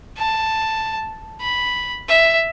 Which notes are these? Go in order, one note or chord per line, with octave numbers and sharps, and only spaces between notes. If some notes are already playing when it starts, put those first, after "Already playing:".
A5
B5
E5